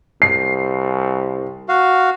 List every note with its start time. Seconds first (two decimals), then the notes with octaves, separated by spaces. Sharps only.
0.22 C2 C7
1.69 F#4 F5